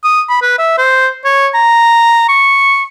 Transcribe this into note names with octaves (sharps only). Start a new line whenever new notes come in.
D#6
B5
B4
E5
C5
C#5
A#5
C#6